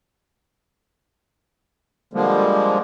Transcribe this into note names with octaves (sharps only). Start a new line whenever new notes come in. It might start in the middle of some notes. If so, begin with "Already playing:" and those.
D3 F3 G3 G#3 A#3